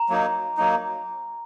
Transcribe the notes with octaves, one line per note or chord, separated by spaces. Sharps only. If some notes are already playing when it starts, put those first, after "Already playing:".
Already playing: A#5
F#3 A#3 D#4
F#3 A#3 D#4